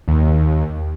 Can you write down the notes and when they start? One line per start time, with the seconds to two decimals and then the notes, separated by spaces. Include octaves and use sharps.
0.08 D#2